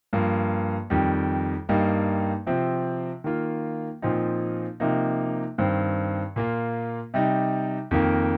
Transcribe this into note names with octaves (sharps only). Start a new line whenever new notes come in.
G2 F3 A#3
F2 D#3 G3
G2 G3 A#3 D#4
C3 F3 C4
D#3 A#3 F4
A#2 F3 C4 D#4
C3 F3 A#3 D#4
G2 D#3 C4
A#2 A#3 F4
C3 G3 D#4
F2 D#3 A#3